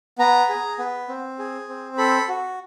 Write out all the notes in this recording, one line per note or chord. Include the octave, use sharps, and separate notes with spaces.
B3 A#5
G#4
B3
C4
G#4
C4
A4 B5
F#4